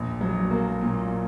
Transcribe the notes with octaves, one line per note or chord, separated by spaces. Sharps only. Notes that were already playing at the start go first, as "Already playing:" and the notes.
Already playing: A#1
F#3
A#3
A#2